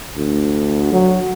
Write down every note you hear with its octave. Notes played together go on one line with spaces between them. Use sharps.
D2
F#3